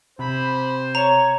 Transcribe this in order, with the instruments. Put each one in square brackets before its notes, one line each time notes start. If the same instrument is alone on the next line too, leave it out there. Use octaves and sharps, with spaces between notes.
[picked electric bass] C3 [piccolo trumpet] C5 [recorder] B5
[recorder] C#5 [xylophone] A#5